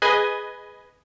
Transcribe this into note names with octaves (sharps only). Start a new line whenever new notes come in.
G#4 B4 D#5 G#5